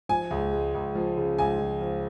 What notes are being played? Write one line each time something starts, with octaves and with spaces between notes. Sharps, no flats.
F3 G#5
C#2
G#3
C#2
F3
C#3
C#2 G#5
F3
F3